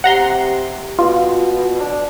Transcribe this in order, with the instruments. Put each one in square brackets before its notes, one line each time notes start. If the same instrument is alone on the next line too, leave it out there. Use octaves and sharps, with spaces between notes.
[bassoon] C3 [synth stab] F#5 A#5 C6
[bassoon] B2 [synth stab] F4
[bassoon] D4